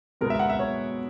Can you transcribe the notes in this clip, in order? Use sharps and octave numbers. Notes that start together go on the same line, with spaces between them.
B2 G#3 B3 A#4
E5
F#5
E5
C#5